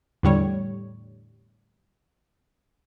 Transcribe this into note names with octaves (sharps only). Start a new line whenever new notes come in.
E2 A2 D3 G3 C#5